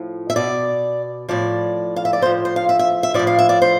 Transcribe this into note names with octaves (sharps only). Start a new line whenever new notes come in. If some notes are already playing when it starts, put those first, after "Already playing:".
Already playing: A2 F3
E5
B2 D5
A2 F3 D5
F5
E5
D5
A2 F3 C5
C5
F5
E5
E5
E5
A2 F3 D5
F5
E5
D5
C5